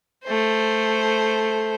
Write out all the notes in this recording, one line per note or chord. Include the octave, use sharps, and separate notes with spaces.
A3 C5